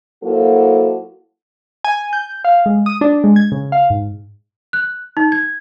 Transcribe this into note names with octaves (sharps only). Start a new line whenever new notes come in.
F#3 A#3 E4 F#4 A4 C5
G#5
G6
F5
G#3
D#6
D4
G#3
G#6
C#3
F5
G#2
F#6
D#4
G#6